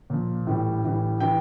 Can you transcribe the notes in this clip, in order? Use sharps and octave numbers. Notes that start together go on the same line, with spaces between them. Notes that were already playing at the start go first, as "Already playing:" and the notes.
A#2 F3
A2 E3 G3
A2 E3 G3
E3 G3 G5